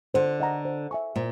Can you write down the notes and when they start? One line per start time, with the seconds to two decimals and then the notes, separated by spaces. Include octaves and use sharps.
0.14 D3 C5
0.40 D#5 F#5 A#5
0.65 C5
0.91 E5 G#5 C#6
1.16 A#2 C5